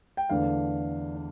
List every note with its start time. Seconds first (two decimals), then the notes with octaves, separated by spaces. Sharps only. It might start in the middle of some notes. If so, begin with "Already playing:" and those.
0.17 G5
0.29 E2 D3 A3 D4 F5
1.16 D4